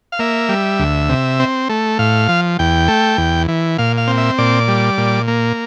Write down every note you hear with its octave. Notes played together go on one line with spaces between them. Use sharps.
F5
A#3 E5
G3
D2
C3
C4
A3
A2 F5
F3
E2 G5
A3
E2
E3
A#2 F5
F5
C4
E5
A#2 D5
G3
A#2
A#3